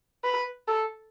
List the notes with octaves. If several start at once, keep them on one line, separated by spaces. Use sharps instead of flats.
B4
A4